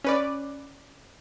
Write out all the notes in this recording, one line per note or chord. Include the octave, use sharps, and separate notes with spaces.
C#4 B4 D5